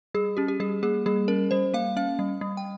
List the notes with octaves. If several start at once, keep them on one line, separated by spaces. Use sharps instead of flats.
G3 G#4
C#4 G4
G4
G3 G#4
A#3 G#4
G3 G#4
C#4 A#4
G3 C5
A#3 F5
C#4 F5
G3
G3
G5